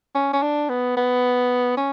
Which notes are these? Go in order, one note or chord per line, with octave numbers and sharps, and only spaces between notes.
C#4
C#4
D4
B3
B3
C#4